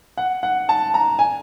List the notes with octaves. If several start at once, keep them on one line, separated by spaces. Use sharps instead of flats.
F#5
F#5
A5
A#5
G#5